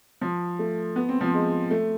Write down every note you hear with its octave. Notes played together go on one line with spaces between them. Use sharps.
F3
A3
B3
C4
F3
G#3
A3